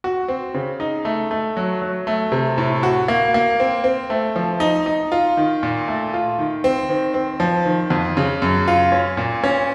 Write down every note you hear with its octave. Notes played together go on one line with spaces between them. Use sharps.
F#4
C4
C#3
D#4
A3
A3
F#3
F#3
A3
C3
A2
F#4
A#3
A#3
C4
C4
A3
F3
D#4
D#4
F4
D#3
A#2
A3
F4
D#3
C4
D#3
C4
F3
D#3
F2
C#3
F#2
F4
C#4
A#2
C#4